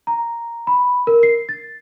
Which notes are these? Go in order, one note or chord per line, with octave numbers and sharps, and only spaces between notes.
A#5
B5
A#4
C7
A6